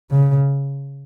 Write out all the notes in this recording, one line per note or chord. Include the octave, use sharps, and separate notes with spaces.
C#3